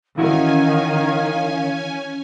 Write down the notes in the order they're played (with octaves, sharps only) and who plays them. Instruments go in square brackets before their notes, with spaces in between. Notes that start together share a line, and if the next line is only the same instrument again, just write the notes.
[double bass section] D#3 [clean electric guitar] E3 E4 F#4 [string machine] C#4 G#5 [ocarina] F5